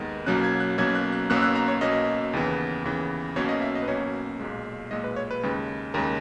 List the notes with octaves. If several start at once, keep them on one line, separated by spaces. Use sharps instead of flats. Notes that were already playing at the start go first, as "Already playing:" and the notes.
Already playing: D#2 D#3 G#3 B3
B1 B2 F#3 A#3 C#4 F#6
G#6
F#6
B1 B2 F#3 A#3 C#4 G#6
F#6
F#6
B1 B2 A#3 C#4 F#6
E6
F#6
A#5
C#5
B1 B2 A#3 C#4 D#5
D#2 C#3 E3 B3
D#2 C#3 E3 B3
B1 B2 A#3 C#4 C#5
D#5
E5
D#5
B4
B1 B2 A#3 C#4 C#5
B1 A#2 G#3
B1 A#2 G#3 D#5
B4
C#5
B4
D#2 C#3 G#3
D#2 C#3 G#3 A#4